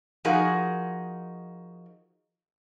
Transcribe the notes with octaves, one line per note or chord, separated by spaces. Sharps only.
F3 D#4 F#4 G#4 A#4